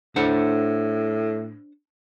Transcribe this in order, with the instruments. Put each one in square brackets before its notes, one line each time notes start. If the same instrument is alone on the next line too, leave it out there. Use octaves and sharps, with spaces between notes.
[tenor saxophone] A2 [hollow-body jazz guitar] D4 C5 F#5